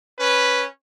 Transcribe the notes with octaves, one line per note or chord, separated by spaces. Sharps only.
C#4 B4